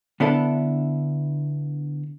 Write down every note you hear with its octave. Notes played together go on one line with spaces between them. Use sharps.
D3 B3 D4 E4 A4